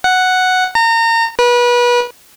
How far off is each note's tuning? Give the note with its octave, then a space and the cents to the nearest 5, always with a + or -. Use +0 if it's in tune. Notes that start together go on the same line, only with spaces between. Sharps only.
F#5 +0
A#5 -30
B4 -30